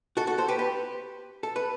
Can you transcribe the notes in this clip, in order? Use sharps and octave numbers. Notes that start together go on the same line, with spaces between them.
F#4 A4
F#4 A4
A4 C5
G4 B4
G4 B4
A4
B4